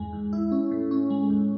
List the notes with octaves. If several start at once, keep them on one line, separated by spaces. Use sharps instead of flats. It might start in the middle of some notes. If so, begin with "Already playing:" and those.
Already playing: E2 G#2 G#3
E2
E4
C#4
A2
C#4
G#3
E2